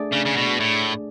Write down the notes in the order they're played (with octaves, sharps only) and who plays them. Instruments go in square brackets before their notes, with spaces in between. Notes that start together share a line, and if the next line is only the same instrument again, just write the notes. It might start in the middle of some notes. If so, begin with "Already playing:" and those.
Already playing: [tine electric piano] A3 D4 G#4 D5
[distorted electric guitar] C#3
C#3
B2
A2